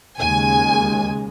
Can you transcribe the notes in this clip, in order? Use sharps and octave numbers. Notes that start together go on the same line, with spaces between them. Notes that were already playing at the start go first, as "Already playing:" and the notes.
D#2 C#3 G#3 G#5